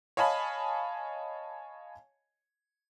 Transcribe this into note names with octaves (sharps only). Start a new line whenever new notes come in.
C#5 D#5 F5 G#5 A5 B5